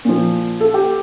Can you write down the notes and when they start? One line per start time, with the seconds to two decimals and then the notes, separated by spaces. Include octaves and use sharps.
0.05 A#2 F3
0.60 A4
0.74 G4